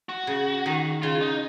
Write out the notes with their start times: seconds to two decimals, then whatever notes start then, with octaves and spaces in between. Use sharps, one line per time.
0.09 F#4
0.27 C#3
0.66 D#3
1.02 C#3 F4
1.21 D#4